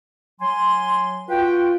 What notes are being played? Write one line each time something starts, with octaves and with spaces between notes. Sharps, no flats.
F#3 G#5 C6
F4 F#4 B4 G5